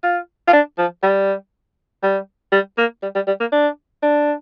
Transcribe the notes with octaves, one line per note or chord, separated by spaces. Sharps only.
F4
F4
D4
F3
G3
G3
G3
A#3
G3
G3
G3
A#3
D4
D4